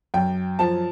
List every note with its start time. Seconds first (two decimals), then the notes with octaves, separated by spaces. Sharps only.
0.14 F#2 G5
0.59 F3 A5